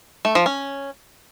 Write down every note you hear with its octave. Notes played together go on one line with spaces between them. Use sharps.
A3
F3
C#4